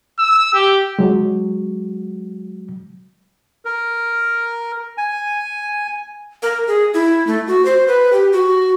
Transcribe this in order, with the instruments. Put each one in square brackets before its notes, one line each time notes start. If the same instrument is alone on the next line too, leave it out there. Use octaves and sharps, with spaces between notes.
[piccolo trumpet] E6
G4
[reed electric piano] F#3 G#3
[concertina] A#4
G#5
[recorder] A#4
G#4
E4
A3
F#4
C5
B4
G4
F#4